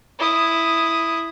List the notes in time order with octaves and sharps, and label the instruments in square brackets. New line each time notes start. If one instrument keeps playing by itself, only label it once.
[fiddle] E4 D#6